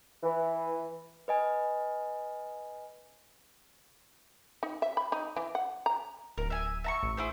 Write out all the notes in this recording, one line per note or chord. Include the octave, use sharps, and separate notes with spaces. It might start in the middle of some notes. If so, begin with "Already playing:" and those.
E3
B4 D#5 G#5
D#4
E5
B5
D#4
E3
F#5
A#5
D1 A#4
E5 G#5
E5 A#5 C#6
A1
E4 G#4 C5